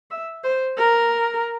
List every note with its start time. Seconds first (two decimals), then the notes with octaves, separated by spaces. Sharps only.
0.11 E5
0.44 C5
0.78 A#4